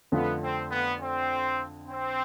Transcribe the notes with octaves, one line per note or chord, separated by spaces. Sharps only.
F2 D3 A3 B3 D4 F4
C4
B3
C4
C4